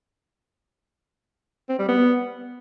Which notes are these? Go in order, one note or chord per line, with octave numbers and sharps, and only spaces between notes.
C4
G3
B3